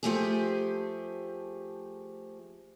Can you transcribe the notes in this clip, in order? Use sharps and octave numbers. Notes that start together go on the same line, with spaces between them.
F3 A3 G4 G#4